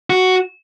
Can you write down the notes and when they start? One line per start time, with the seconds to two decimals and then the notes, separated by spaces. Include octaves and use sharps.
0.10 F#4